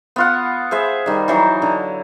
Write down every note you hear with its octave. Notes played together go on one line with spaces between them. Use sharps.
B3 F4 F#5
G#4 C5 E5
D#3 G3
E3 F#3 D#4
D3